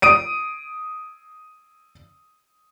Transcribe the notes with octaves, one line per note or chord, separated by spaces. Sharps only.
D#6 D7 D#7